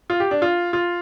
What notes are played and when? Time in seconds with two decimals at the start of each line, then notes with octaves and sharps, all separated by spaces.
0.10 F4
0.20 G4
0.31 D4
0.42 F4
0.73 F4